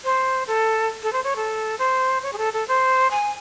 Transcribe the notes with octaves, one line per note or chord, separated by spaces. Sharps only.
C5
A4
A4
C5
C#5
A4
C5
C#5
G#4
A4
A4
C5
G#5